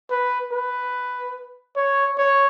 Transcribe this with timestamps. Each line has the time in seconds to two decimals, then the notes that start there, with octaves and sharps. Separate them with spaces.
0.10 B4
0.52 B4
1.76 C#5
2.18 C#5